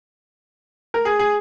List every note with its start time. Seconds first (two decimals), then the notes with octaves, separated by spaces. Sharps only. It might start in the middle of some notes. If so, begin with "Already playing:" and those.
0.94 A#4
1.05 G#4
1.19 G#4